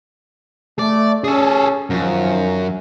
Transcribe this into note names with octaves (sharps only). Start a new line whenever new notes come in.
A3 D5
C#4 G#4 A4
F#2 D#3 F3